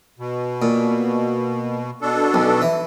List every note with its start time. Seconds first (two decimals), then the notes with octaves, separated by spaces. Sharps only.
0.19 B2
0.62 A#2
2.01 B2 D4 A4
2.34 B1
2.62 E3